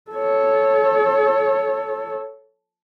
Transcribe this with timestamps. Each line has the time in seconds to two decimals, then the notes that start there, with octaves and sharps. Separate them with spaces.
0.11 A4 C#5